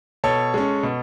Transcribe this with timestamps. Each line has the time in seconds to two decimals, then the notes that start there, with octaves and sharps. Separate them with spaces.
0.24 B2 A4 C#5
0.54 G#3 C#4
0.83 B2